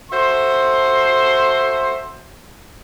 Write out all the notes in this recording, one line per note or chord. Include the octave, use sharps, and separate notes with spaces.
F#4 A4 C5 E5 C6